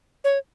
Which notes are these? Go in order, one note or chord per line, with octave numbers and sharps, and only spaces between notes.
C#5